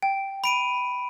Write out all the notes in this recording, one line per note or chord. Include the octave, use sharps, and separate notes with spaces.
G5
B5 D7 D#7